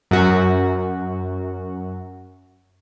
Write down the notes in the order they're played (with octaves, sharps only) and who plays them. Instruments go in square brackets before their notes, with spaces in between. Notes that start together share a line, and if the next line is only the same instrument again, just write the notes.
[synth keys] F#2 F#4